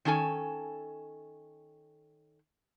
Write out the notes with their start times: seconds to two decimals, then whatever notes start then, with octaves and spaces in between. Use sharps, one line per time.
0.05 D#3 C#4 D4 A4 G#5